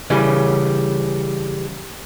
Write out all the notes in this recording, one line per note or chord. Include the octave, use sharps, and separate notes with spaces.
C#3 E3 G3 C#4